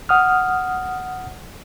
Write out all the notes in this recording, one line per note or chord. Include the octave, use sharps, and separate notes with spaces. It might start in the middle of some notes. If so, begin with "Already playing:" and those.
F#5 D#6 F6